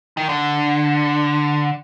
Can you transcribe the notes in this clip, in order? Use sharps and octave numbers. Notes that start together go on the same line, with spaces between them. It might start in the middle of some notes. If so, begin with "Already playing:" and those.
D#3
D3